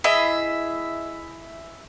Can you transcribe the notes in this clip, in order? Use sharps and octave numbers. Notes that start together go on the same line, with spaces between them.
E4 G#4 D#5 E5